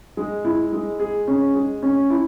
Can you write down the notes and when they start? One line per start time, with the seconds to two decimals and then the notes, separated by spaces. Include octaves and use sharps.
0.17 G#3
0.45 E4
0.72 G#3
1.00 G#4
1.28 C#4
1.55 G#3
1.83 C#4
2.10 E4